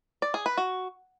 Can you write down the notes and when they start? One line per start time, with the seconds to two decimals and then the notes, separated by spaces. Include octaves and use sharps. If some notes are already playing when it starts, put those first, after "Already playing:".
0.22 D5
0.34 G#4
0.46 B4
0.57 F#4